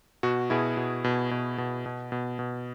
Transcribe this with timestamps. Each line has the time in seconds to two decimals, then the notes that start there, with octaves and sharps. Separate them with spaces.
0.23 B2 F#4
0.50 B2 E4 G#4
0.77 B2
1.04 B2
1.31 B2
1.58 B2
1.86 B2
2.12 B2
2.39 B2